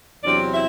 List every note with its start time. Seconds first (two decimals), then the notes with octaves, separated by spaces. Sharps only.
0.23 E2 C3 F#3 C4 D4 D5
0.53 E4 E5